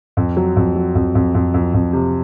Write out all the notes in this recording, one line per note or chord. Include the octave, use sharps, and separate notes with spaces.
F2
F#3
F2
F#3
F2
F2
F2
F2
F2
C3